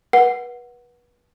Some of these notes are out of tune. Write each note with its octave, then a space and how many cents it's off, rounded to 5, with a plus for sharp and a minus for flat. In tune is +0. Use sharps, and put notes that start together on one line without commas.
B4 -30 F#5 +0